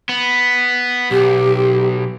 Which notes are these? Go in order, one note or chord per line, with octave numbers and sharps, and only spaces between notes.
B3
B1 G4